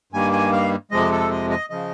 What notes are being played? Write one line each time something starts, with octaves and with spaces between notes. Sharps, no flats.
G2 D#3 G3 A#3 G#5
G#5
F5
F2 C3 F3 G#3 D#5
A4
D#5
D#5
C#3 F3 D#5